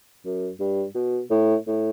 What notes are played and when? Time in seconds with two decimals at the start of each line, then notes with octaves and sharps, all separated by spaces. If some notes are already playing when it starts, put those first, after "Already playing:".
0.25 F#2
0.60 G2
0.95 B2
1.31 A2
1.67 A2